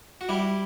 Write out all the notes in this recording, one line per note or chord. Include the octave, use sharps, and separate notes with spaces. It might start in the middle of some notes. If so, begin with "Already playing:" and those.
F#4
G3 E4 G4